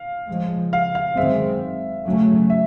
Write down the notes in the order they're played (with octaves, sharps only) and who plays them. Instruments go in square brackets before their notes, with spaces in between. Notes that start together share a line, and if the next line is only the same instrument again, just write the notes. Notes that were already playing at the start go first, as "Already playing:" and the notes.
Already playing: [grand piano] F5
[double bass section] C#3 F3 G#3
[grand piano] F5
F5
[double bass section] F#2 D#3 G#3 C4 [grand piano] E5
[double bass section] C#3 F#3 A3 C#4
[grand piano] E5